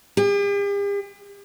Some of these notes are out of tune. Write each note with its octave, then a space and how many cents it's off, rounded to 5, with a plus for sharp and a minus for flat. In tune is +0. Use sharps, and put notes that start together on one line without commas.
G4 +45